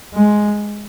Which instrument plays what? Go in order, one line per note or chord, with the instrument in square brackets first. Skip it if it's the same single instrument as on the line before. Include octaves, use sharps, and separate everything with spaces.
[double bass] G#3